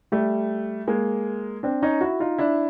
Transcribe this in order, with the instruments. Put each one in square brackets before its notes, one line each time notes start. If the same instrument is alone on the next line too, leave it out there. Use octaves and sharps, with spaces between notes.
[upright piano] G3 A3
G#3 A#3
C4 D4
C#4 D#4
E4 F#4
D#4 F4
D4 E4